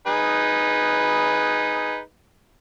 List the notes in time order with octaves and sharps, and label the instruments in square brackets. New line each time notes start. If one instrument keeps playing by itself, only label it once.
[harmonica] D#4 G#4 B4